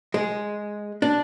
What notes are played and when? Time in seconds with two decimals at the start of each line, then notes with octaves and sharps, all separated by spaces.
0.14 G#3
1.02 D4